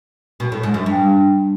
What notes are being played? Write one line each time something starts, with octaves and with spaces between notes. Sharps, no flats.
B2
A2
G#2
F#2
G2